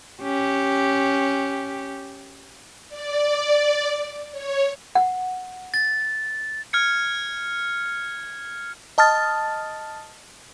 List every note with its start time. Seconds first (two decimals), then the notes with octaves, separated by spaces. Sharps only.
0.22 C#4 G4
2.89 D5
4.32 C#5
4.95 F#5
5.74 A6
6.73 F6 G#6 C#7
8.98 D#5 A5 D#6 F6 A6